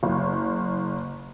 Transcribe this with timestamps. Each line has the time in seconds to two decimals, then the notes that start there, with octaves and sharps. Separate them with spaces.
0.03 F#1